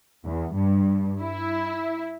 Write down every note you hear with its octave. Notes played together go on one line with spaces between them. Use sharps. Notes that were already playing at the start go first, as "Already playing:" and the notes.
E2
G2
E4